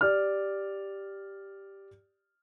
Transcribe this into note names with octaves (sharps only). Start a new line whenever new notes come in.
G4 D5 F6